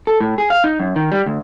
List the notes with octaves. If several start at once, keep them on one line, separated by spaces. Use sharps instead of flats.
A4
A2
G#4
F5
D#4
F#2
D#3
G3
D2